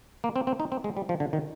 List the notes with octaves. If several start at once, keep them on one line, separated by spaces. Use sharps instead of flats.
A#3
C4
C4
D#4
C4
G#3
G3
F3
D3
D#3